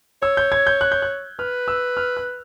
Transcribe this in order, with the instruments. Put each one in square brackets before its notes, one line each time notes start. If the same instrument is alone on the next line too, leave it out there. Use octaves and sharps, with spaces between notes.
[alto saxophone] C#5 [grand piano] E6
[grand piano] G6
G#6
G6
F#6
G6
F#6
[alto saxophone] B4 [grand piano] F6
[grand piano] E6
F6
F#6